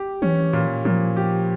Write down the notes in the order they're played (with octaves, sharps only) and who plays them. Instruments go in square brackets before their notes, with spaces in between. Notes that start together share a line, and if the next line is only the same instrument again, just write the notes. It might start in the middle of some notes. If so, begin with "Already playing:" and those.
Already playing: [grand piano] G4
[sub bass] E3 [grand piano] C#4
[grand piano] A#2
[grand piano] A#2 [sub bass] F3
[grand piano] G4